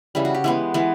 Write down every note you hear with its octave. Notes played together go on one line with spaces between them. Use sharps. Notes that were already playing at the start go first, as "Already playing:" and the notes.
C#3 E3 G3
F#4
G4
E3 G#3 B3
E3 G#3 B3